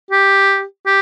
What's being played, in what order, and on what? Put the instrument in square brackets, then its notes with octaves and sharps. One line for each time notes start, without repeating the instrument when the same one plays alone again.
[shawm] G4
G4